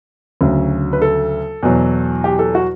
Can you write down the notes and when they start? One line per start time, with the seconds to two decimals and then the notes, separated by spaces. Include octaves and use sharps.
0.41 D2 C#3 F#3
0.93 B4
1.02 A4
1.63 E2 B2 F#3
2.24 G4
2.39 A4
2.55 F#4